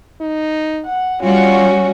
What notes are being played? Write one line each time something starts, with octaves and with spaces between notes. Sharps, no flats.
D#4
F#5
G3 C#4 F4 F#4